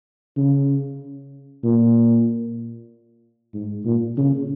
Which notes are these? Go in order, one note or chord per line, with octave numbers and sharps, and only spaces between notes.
C#3
A#2
G#2
A#2
C#3